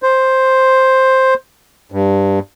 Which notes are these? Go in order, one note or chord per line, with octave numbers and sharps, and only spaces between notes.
C5
G2